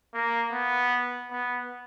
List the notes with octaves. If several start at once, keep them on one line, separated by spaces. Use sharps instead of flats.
A#3
B3
B3